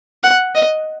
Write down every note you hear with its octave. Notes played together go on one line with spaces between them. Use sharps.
F#5
D#5